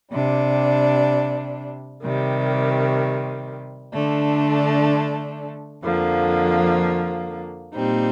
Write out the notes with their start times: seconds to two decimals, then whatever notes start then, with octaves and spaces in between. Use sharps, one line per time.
0.12 C3 G3 D4
2.03 C3 D#3 G3
3.93 D3 A3 D4
5.84 F2 D3 F3 A#3
7.74 A#2 G3 C4 D#4